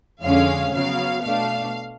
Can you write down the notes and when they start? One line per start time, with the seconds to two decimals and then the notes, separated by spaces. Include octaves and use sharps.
0.23 F2 D3 G#3 C#4 F5
0.73 C#3 F#3 B3 F5
1.23 B2 A3 D4 F5